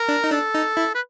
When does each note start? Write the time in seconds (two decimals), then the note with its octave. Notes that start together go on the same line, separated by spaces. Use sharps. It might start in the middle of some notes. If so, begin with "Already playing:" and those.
Already playing: A#4
0.08 D4
0.24 D#4
0.32 D4 A4
0.54 D#4
0.77 E4
0.94 B4